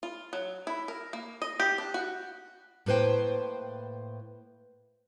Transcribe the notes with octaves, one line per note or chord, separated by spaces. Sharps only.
F4
F#3
E4
A#4
A#3
D#5
G4
D4
F#4
A2 A#3 B4 C5 G5